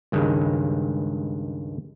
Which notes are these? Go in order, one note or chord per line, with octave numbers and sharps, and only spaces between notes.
C#2 G2 D#3 G#3